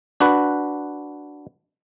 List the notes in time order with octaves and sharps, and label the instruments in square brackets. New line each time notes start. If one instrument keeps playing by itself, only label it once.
[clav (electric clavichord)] D4 F#4 B4